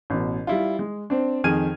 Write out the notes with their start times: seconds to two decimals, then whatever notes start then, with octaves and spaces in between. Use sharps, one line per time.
0.10 A1 B2
0.47 G3 E4 F4
0.79 G#3
1.10 C4 D4
1.44 F2 D#3 G#4 F6 G#6 D#7